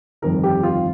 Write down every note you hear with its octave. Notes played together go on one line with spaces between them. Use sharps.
G1 F2 D#3 A#4
G4
F4